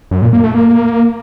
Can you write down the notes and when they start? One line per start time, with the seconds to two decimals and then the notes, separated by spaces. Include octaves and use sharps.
0.11 F#2
0.22 A#2
0.33 A#3
0.44 A3
0.55 A#3